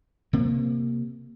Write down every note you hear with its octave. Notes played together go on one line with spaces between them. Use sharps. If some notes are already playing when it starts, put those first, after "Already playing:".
C3 A#3 C4